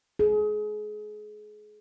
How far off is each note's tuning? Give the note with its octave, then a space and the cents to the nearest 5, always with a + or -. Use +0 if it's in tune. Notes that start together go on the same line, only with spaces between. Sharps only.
G#4 +30